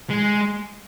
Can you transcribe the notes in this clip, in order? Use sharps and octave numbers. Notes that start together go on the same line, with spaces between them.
G#3